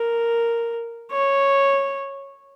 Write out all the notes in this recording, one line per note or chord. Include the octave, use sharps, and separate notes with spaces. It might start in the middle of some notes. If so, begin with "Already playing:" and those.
Already playing: A#4
C#5